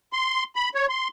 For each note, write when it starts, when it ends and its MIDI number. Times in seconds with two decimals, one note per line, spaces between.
0.13 0.44 84
0.56 0.69 83
0.75 0.86 73
0.89 1.08 84